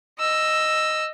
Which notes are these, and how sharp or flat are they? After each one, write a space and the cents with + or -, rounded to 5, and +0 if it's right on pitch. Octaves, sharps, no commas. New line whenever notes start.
D#5 +0 E6 +5